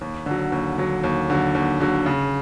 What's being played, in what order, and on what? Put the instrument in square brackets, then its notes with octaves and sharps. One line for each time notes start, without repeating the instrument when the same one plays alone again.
[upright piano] D#2
D3 F#3
D#2
D3 F#3
D#2
D3 F#3
D#2
D3 F#3
C#3